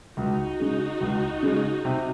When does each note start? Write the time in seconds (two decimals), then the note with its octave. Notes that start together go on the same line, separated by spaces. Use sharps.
0.17 C#2 D#4 F#4
0.60 C#3 G#3
1.01 C#2
1.43 C#3 G#3
1.85 C3